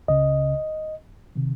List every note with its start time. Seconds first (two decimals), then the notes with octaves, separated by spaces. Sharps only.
0.08 C#2 C#3 D#5
1.36 C3 D#3